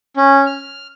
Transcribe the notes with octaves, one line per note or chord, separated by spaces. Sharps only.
C#4
F6